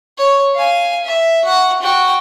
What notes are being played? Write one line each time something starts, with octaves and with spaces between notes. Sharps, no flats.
C#5
F5 G#5
E5
F#4 F#5
F#4 G5